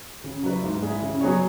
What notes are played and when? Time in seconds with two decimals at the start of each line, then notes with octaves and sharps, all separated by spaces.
0.24 C#3
0.43 F#3 E4 B4
0.63 G#2
0.82 G#3 E4
1.02 C#3
1.21 F#3 B3 G#4 C#5